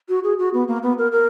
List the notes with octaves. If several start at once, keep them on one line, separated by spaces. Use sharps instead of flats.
F#4
G#4
F#4
B3
A#3
B3
A#4
A#4